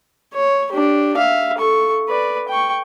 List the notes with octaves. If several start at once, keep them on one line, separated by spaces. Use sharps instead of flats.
C#5
D4 G4
E5 F5
A4 C#6
B4 D5
G5 C#6